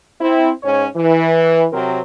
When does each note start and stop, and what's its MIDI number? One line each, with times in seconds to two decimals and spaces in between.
0.21 0.51 60
0.21 0.51 64
0.63 0.86 44
0.63 0.86 61
0.63 0.86 73
0.96 1.67 52
1.73 2.01 48
1.73 2.01 54
1.73 2.01 60
1.73 2.01 70